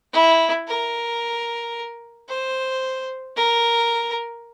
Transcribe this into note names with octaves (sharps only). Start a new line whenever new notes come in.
E4
A#4
C5
A#4